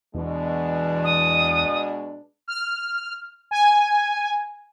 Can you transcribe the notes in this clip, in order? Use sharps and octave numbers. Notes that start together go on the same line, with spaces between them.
E2 B2 G#3 D4
D#6
F6
G#5